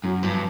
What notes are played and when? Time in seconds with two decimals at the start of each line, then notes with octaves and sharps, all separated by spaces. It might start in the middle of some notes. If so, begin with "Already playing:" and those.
0.04 F#2 F#3
0.23 G2 F3